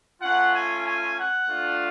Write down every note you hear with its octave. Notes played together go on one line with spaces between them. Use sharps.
A3 C#4 F4 F#5
G#5
G#5
F#5
A3 D4 F4